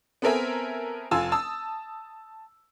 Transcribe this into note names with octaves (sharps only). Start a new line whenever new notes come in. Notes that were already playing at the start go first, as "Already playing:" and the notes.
B3 C4 A4 A#4 E5 G#5
F1 F4 G#5 A5 E6
A5 D#6 E6